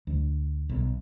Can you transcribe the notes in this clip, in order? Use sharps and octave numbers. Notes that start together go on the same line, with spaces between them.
D2
B1